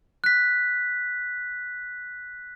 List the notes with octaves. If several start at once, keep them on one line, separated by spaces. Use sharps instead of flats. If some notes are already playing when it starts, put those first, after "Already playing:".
F#6 B6